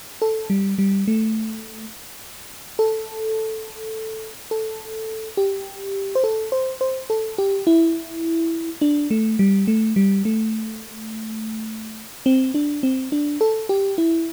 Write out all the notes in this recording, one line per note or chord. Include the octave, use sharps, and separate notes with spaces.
A4
G3
G3
A3
A4
A4
G4
C5
A4
C5
C5
A4
G4
E4
D4
A3
G3
A3
G3
A3
C4
D4
C4
D4
A4
G4
E4